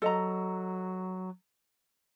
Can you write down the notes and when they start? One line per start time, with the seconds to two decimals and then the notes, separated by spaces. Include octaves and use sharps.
0.02 F#3 A4 D#5 A#5